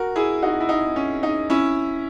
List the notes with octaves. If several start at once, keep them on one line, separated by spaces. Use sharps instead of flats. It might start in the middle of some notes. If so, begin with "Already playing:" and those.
Already playing: F#4 A#4
E4 G#4
D#4 F#4
F#4
E4
D#4
C#4
D#4
C#4 E4